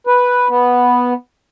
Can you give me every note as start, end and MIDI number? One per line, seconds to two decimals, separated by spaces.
0.07 0.48 71
0.49 1.13 59